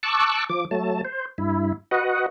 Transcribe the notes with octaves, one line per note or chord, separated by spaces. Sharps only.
A5 C#6 D6 E6 F#6
F3 D6
F#3 A3 A5
C5
G2 E4
F#4 B4 D#5 F#5